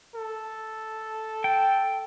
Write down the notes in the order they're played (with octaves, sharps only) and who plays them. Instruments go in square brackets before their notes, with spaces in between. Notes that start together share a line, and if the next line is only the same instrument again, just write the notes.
[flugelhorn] A4
[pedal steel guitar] G5